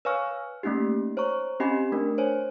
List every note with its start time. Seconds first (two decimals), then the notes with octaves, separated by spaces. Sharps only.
0.05 B4 C#5 F5 G#5 C#6 F6
0.63 A3 A#3 C#4 D#4 G4
1.17 C5 C#5 A#5 C#6
1.60 C4 C#4 G4 D#5 G#5 B5
1.92 A3 D4 A#4
2.18 C5 C#5 G#5